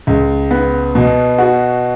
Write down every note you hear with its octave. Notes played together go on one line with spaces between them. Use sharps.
C#2
B3
B2
F#4